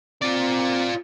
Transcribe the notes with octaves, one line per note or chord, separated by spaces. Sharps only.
C4 F4 D5